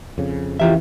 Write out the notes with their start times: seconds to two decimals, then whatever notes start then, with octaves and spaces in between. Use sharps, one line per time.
0.18 F2 C#3
0.60 E3 F4 G4 E5